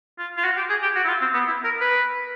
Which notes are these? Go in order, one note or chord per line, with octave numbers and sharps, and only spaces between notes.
F4
F4
F#4
G4
G#4
G4
F#4
E4
F4
C4
B3
E4
A#4
B4